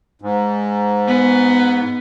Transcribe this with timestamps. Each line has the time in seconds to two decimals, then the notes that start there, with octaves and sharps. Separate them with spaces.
0.22 G#2
1.08 B3